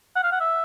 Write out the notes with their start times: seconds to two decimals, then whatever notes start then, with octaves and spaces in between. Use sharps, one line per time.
0.16 F#5
0.23 F5
0.32 F#5
0.40 E5